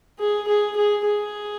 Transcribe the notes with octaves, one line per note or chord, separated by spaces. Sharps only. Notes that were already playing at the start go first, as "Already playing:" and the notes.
G#4
G#4
G#4
G#4